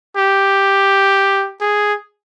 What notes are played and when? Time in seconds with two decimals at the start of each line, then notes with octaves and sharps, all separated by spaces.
0.17 G4
1.61 G#4